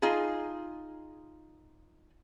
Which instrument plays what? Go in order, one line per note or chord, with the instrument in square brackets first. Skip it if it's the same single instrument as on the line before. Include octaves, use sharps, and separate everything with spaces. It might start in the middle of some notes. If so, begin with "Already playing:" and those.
[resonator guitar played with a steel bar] D#4 F4 G#4